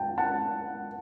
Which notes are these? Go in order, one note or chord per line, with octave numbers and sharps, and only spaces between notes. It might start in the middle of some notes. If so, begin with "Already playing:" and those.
Already playing: G5 A5
F#5 A5